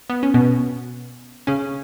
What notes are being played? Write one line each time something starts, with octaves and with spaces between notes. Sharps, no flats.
B3
C#4
B2 B3
C#3 C#4